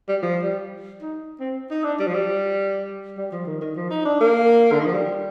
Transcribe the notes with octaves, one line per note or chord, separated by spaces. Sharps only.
G3
F3
G3
D#4
C4
D#4
D4
G3
F3
G3
G3
F3
D#3
D#3
F3
D#4
D4
A#3
D3
D#3
F3
G3